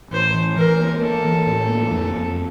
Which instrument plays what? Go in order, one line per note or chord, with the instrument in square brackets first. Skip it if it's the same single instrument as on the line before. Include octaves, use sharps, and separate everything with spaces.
[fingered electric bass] A1 [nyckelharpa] C5
[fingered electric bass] E3
[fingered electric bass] E3 [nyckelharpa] A#4
[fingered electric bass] A#3
[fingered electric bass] A#3 [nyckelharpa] A4
[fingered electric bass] E3
A2
A#3
F2
F2